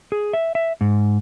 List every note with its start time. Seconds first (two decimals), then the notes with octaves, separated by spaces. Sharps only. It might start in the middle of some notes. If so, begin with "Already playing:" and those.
0.12 G#4
0.33 E5
0.55 E5
0.81 G#2